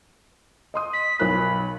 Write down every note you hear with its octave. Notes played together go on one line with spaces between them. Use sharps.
D#5 C6 D#6
B6
B1 A#4 B5 F#6